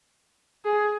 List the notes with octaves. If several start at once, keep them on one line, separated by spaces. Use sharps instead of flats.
G#4